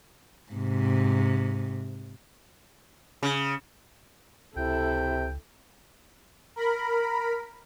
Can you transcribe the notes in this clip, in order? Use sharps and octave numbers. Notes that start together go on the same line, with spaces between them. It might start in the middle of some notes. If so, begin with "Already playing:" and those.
G#2 C3
C#3
C#2 C3 E4 A4 G5
A#4 B5